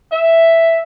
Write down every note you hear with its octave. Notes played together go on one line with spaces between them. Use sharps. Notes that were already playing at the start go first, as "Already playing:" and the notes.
E5